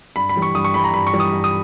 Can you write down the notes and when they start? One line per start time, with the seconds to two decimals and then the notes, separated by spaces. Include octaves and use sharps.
0.16 G2 B5
0.29 B5
0.36 E3 G3
0.42 C#6
0.55 G2 D#6
0.65 C#6
0.74 E3 G3 B5
0.84 A#5
0.93 G2 B5
1.07 C#6
1.13 E3 G3
1.20 D#6
1.33 G2
1.44 D#6